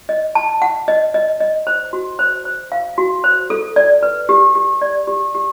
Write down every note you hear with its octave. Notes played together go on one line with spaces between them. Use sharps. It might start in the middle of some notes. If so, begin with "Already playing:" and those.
D#5
A5
F#5
D#5
D#5
D#5
C5
F#4
C5
C5
F5
F#4
C5
A4
D5
B4
G4
G4
D5
G4
G4